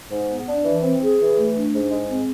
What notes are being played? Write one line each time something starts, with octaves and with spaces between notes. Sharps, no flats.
G#2
B3
D4
E3
C4
G#4
E3
A3
D4
G#2
G#3
C4